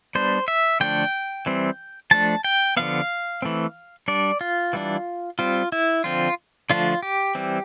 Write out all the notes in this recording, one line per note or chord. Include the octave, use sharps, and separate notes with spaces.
G3 B3 D4 C5
E5
D3 F3 A3 D4 G5
E3 G3 C4
F3 A3 D4 A5
G5
D3 F3 B3 F5
E3 A3 C4
G3 D4 D5
F4
E3 G3 D4
G3 C4 F4
E4
D3 F3 C4 F4
D3 F3 A3 D4 F4
G4
E3 G3 C4